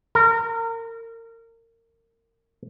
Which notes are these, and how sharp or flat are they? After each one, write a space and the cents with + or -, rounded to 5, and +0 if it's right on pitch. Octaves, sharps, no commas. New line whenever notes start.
A#4 -30